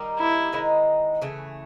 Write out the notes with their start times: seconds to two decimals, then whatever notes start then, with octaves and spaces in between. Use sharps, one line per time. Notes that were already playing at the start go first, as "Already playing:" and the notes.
Already playing: D#3 G3 A#3 D#4
0.19 E4
0.53 D#3 G#3 C4 D#4
1.22 C#3 E3 A3